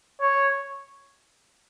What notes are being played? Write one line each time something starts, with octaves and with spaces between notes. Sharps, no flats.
C#5